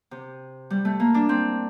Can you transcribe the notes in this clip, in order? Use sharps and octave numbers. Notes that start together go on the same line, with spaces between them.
C3
G3
A3
A#3
D4
C4